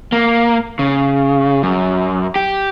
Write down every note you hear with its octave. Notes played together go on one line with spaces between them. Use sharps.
A#3
C#3
F#2
G4